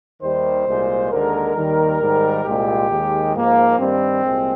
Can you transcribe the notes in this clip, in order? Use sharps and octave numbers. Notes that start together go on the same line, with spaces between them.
D#2 D#3 G3 C5
C2 A#2 G#3
D#2 D3 G#3 A#4
D#2 D#3 G3
G#2 D#3 G3
C2 A#2 G#3 G4
D#2 D#3 G#3
G#2 F3 G#3 A#3
G2 D#3 G3 C4
C2 A#2 G#3